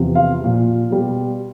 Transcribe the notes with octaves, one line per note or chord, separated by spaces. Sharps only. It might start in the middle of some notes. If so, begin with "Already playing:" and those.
Already playing: E2 C3 F3
F4 F5
A#2 F3
B2 G3